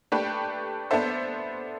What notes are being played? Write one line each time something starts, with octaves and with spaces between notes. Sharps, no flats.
A3 D4 G4 B4
B3 D4 A4 C5 E5